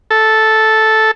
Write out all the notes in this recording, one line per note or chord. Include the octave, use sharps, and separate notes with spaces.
A4